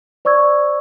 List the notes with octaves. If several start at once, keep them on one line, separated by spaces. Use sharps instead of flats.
C5 D5 C#6 E6 G#6